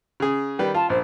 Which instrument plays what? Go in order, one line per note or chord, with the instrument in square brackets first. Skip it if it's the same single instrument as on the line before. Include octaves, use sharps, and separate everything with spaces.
[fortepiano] C#3 G#4
D#3 G3 B4
[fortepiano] F4 [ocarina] A5
[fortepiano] A#1 [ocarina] C5